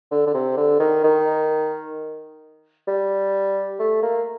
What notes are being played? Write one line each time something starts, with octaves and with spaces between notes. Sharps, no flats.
D3
D3
C3
D3
D#3
D#3
G3
A3
A#3